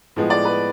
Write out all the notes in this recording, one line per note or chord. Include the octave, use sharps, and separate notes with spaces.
A2 F3 G#3 B3
D5
B4